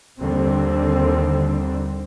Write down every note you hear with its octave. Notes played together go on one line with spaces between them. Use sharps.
D#2 D3 G3 C4